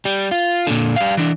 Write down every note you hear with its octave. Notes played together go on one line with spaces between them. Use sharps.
G3
F4
A#2 D3
G3 F5
E3 D4